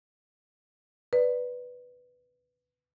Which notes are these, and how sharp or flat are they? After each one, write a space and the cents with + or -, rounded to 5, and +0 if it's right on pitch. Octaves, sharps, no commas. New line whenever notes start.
B4 +0 D5 +0